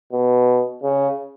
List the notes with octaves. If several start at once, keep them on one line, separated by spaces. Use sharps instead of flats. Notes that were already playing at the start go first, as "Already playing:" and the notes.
B2
C#3